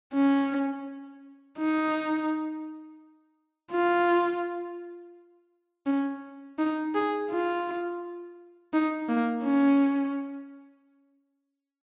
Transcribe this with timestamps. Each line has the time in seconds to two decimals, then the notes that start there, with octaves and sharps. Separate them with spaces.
0.14 C#4
1.58 D#4
3.71 F4
5.86 C#4
6.59 D#4
6.95 G#4
7.30 F4
8.73 D#4
9.09 A#3
9.44 C#4